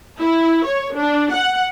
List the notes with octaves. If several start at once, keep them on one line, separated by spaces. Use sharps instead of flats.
E4
C#5
D4
F#5